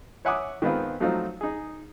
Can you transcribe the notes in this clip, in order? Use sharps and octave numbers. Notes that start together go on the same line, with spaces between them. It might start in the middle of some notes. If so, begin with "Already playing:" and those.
C#5 E5 F#5 G#5 D6 D#6
D#3 G#3 B3 C4 F4
F3 F#3 A3 C4 D#4 F4
D#4 G#4